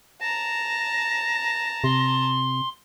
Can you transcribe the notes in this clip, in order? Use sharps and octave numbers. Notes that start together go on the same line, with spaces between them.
A5 A#5 A#6
C3 C6